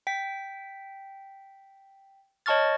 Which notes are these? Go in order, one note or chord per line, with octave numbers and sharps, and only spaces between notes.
G5 B6
C#5 D#5 A5 C#6 F6 A6